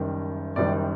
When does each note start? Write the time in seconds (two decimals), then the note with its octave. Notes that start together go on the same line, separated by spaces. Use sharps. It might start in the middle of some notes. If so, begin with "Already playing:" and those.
Already playing: F#1 F#2 D#3 G3
0.56 F#1 F#2 D#3 G3 D5